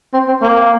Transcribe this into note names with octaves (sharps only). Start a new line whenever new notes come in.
C4
C4
A#3